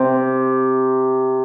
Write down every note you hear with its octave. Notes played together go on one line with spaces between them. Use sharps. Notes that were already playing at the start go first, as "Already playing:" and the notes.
Already playing: C3